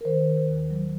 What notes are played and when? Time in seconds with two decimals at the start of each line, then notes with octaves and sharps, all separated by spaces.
0.01 A#4
0.05 D#3 C5
0.27 D#3
0.49 D#2
0.70 F#3